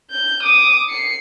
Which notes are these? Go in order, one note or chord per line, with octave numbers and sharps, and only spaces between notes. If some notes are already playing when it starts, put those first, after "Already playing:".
G6
D6 D#6
C7 C#7